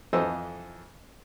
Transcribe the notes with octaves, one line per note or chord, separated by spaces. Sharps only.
F2 E3 A4 C5 D#5 E6